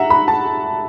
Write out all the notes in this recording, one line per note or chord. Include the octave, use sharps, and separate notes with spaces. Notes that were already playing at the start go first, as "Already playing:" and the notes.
Already playing: E5 F#5 A#5
B5
A5